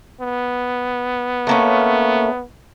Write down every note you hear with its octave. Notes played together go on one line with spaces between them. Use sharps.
B3
A3 A#3 C#4